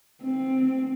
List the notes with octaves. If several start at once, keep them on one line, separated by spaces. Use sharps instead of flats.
C4